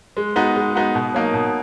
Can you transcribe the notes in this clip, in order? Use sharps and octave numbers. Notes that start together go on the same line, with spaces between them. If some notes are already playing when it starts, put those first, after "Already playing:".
G#3
B3 D#4 F#4
G#3
B3 D#4 F#4
B2
F#3 A#3 D#4
B2